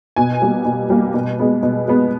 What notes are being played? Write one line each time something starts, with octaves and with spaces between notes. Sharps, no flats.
B2 G#5
G3 A#3
B2
G3 A#3
B2
G#3 B3
B2
G#3 B3